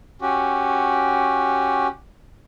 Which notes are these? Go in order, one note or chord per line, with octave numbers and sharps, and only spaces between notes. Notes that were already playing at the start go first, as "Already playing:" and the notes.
C#4 F#4 G4